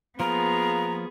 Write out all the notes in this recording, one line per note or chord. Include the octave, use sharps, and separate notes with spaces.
F3 A#3 B3 F4 G#4 A#5